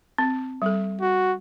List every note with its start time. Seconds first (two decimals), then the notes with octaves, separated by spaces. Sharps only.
0.18 C4
0.62 G3 A4
1.01 F#4